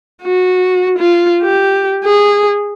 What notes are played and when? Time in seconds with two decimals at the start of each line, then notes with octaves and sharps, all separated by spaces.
0.23 F#4
0.98 F4
1.42 G4
2.04 G#4